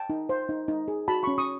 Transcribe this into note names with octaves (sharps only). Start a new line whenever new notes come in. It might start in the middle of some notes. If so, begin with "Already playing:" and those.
Already playing: G5 A5
D#4
C5
D#4
D#4
G#4
F#4 A5 B5
C#4 B5 C#6
C#6 D#6